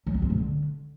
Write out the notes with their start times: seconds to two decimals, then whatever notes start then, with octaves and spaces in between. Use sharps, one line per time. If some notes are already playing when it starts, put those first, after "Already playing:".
0.07 F#3
0.14 B3
0.22 C4
0.30 C#3
0.38 D3